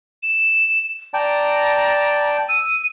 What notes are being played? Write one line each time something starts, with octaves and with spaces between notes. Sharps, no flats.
E7
D5 G5 A5 A#5
E6 D#7